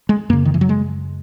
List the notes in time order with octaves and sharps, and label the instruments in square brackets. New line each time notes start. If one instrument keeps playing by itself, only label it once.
[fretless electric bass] G#3
F#2 C#3 A#3
D#3
E3
F#3
G#3